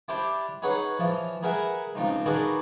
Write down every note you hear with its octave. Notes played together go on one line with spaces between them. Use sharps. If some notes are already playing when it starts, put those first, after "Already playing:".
D4 E4 G4 C5
D#4 G#4 B4 C#5 F#5
E3 F3
G#4 A#4 B4 E5 F#5 G#5
C#2 F3 C4 D#4
D4 D#4 F#4 G#4 A#4 B4